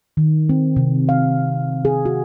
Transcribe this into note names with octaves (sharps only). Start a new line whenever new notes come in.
D#3
C4
C3
F5
G#4
F#4